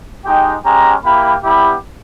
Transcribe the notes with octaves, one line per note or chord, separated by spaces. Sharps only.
G#3 D#4 G4 G5
G#3 C#4 G4 A#5
A#3 E4 G4 B5
G3 B3 E4 G4 B5